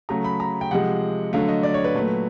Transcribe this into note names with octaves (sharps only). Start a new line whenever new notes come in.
C#3 F#3 A3 A#5
B5
A#5
G5
C3 F3 G#3 F#5
D3 F#3 A3 F5
D#5
D5
C#5
B4
A#2 F#3 A3